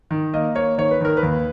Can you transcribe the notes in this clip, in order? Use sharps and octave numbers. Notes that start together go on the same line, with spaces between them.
D#3
A#3 D#5
A#3 C#5
D#3 C#5
B4
D#3 A#4
B4
D#2